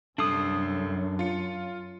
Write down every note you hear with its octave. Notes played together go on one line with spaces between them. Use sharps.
C2 F#2 D4 A4 D#6 C7
F4 C#7